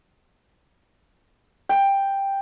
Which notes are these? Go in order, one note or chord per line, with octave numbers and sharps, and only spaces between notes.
G5